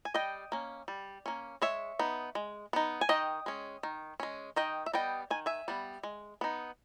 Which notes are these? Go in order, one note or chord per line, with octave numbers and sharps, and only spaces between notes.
G#5
G3 D#5 G5
A#3 C#4
G3
A#3 C#4
G#3 C#5 E5
B3 D#4
G#3
B3 D#4
G#5
D#3 D#5 G5
G#3 C#4
D#3
G#3 C#4
D#3 D#5 G5
E5
G3 B3 D#5 G5
D#3 G#5
E5 G#5
G3 B3
G#3
B3 D#4